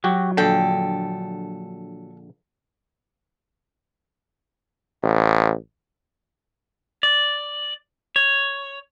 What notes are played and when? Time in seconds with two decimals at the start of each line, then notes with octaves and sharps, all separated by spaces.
0.04 F#3 F#4 G4
0.37 A#1 D3 A4 G5
5.03 A1
7.03 D5
8.16 C#5